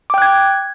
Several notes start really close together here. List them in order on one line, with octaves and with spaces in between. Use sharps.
D6 G5 F#6 G#6